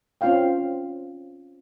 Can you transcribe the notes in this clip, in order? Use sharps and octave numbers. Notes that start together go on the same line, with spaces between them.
C4 C#4 F4 C5 F5 G5